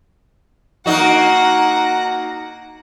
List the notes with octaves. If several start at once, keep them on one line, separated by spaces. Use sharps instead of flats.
A#3 D#4 F#4 F#5 A#5